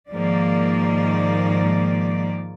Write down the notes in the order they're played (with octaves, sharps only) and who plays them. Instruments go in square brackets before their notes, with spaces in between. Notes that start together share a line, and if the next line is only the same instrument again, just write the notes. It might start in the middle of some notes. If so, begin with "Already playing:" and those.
[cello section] G#2 D#3 F3 A#3 D5